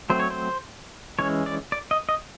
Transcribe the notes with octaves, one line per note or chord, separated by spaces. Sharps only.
F#3 A3 C4 C5
C#5
C5
E3 G#3 C#4 C#5
D5
D5
D#5
D#5